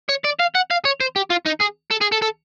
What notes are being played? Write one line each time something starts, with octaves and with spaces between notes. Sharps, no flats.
C#5
D5
F5
F#5
F5
C#5
C5
G4
F4
D#4
G#4
A4
G#4
A4
A4